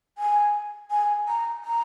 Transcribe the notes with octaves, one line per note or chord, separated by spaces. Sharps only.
G#5
G#5
A#5
A#5